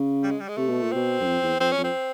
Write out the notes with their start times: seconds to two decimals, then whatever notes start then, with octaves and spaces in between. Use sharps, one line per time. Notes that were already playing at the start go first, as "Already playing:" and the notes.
Already playing: C#3
0.23 G3
0.31 G#3
0.40 G3
0.48 G#3
0.57 C3 A3
0.69 B2
0.82 A#2
0.92 B2 C4
1.21 F#2
1.26 F2
1.43 E2
1.60 F2 C4
1.72 C#4
1.78 F2
1.84 C4